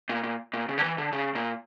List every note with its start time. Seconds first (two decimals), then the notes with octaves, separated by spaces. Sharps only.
0.09 A#2
0.24 A#2
0.54 A#2
0.69 C#3
0.78 D3
0.84 E3
0.98 D3
1.13 C#3
1.35 A#2